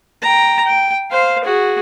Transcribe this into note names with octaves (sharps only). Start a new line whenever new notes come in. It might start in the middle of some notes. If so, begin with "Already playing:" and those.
G5 A#5
G5
C5 F5
F#4 G#4